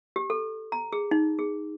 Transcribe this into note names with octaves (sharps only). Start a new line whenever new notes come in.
G4
A4
A#5
G#4
D#4
G#4